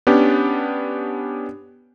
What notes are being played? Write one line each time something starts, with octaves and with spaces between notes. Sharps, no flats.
B3 C#4 D4 G4